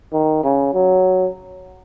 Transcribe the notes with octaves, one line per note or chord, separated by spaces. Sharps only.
D#3
C#3
F#3